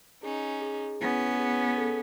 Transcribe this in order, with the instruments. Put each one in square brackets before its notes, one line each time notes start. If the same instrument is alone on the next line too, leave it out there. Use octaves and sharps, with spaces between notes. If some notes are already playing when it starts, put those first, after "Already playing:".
[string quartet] C#4 D#4 [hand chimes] G#4
[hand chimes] G#4
[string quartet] B3 C#4 [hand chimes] E4
[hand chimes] G#4
A4